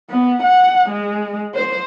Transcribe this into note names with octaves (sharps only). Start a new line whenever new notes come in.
B3
F#5
G#3
C5